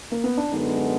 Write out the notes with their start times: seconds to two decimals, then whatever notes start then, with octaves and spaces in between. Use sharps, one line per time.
0.12 A#3
0.24 B3
0.37 D4
0.50 F#2 D3 G#3 B3 D#4